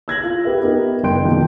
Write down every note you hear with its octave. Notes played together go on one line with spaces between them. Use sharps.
E6 G#6 A#6 F#7
F4
G4 A#4 B4 E5
B3 D#4 G4 A#4
F#1 B3 G5 C6 G6 D7
F2 B2 D#3 A#3